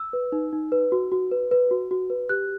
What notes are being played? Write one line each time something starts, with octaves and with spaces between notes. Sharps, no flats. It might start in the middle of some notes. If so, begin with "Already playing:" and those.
Already playing: E6
B4
D#4
D#4
B4
F#4
F#4
B4
B4
F#4
F#4
B4
G4 F#6